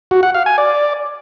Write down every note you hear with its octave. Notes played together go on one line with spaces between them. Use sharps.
F#4
F#5
F5
G#5
D5